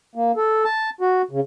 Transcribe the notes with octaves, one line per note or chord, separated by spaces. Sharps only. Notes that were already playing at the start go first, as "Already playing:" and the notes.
A#3
A4
A5
F#4
C#3